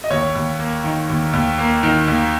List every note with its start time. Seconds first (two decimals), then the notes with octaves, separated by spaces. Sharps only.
0.04 D#5
0.10 D#2 C#5
0.35 D#2
0.60 A#3
0.84 D#3
1.09 D#2
1.33 D#2
1.58 A#3
1.83 D#3
2.08 D#2